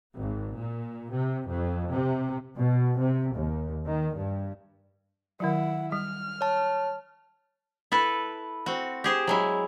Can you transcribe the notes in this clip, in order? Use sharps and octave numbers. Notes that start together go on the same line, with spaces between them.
G#1
A#2
C3
F2
C3
B2
C3
D#2
D#3
G2
D#3 F#3 E4 F#5
G3 F6
C#5 A5
E4 A4 B4
C4 F#4
G4 G#4 C5
F#3 G#3 E4